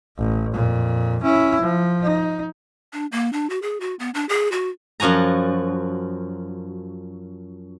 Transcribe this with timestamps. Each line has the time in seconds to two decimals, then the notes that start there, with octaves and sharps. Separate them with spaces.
0.18 A1
0.53 F2 A#2
1.23 C#4 E4
1.61 F3
2.03 D#4
2.93 D4
3.12 A#3
3.33 D4
3.50 F#4
3.62 G#4
3.80 F#4
3.99 B3
4.14 D4
4.29 G#4
4.52 F#4
5.00 F#2 F3 F#4 G#5 A#5